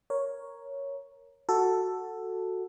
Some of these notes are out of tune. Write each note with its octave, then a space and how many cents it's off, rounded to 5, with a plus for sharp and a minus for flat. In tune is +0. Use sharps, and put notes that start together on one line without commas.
A#4 +5 C#5 +0
F#4 +0 A4 +5